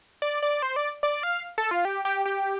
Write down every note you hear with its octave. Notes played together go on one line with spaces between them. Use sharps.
D5
D5
C5
D5
D5
F5
A4
F4
G4
G4
G4